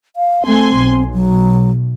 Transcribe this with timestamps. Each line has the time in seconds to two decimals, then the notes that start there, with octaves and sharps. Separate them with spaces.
0.16 F5
0.46 A3 C4 G#5 C6
0.81 B1
1.14 F#3